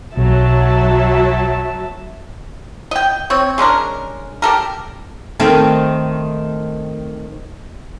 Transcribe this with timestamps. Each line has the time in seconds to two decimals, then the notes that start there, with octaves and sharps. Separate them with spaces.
0.17 B1 F#3 E5 A5
2.91 D#5 G5
3.30 C4 C#5
3.58 G#3 C#4 D4 A#4
4.42 G4 A4 A#4
5.40 D#3 A3 C4